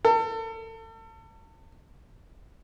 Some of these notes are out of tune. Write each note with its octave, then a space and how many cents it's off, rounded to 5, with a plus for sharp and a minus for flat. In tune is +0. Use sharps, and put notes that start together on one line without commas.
A4 +35